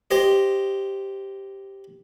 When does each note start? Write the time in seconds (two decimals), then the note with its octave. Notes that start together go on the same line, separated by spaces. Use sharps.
0.11 G4 C5 D#5